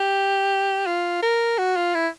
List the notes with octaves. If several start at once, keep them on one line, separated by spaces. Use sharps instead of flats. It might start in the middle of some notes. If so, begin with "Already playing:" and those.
Already playing: G4
F4
A#4
F#4
F4
E4